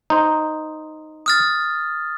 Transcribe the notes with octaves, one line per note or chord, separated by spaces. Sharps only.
D#4 C5
D#6 F6 A6